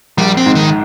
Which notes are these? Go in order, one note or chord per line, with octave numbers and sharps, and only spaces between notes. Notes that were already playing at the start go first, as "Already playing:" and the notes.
A#1 G3
C4
G#2
D#3